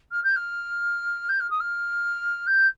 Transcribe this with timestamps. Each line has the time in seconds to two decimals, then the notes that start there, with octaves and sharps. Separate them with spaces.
0.11 F6
0.24 G6
0.36 F6
1.29 G6
1.40 F6
1.50 D#6
1.60 F6
2.47 G6